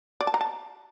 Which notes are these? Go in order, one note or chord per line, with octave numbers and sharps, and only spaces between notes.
D5
A5
A#5
A5